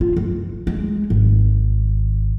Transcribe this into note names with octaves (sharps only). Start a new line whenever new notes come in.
F4
F#1
G#3
G#1